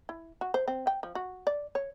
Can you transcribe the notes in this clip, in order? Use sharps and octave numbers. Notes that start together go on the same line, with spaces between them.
E4
F#4
C5
C4
G5
F3
F#4
D5
C#5